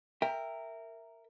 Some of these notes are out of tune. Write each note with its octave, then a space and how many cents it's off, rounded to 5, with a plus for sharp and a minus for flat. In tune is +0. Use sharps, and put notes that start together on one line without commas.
A#4 -10 E5 +0 G5 +15